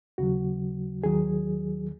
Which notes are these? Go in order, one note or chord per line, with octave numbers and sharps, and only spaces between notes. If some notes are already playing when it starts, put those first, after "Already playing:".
D#2 C#3 F#3 F#4
D#2 D#3 F#3 G#4